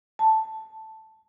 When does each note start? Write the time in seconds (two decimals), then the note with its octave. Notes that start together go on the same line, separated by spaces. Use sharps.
0.19 A5